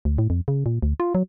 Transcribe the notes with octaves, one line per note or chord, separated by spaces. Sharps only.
D2
A2
F2
C#3
A#2
D2
F4
F#3